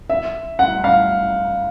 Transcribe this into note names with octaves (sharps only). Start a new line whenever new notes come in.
E5
F#5
F5